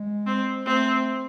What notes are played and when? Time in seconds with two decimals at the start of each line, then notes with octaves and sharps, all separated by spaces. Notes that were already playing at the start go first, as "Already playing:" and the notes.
Already playing: G#3
0.26 C4
0.65 A3 C4